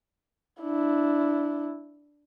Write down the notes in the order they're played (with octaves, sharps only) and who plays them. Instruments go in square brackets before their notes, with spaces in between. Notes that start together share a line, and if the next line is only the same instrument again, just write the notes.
[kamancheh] D4 E4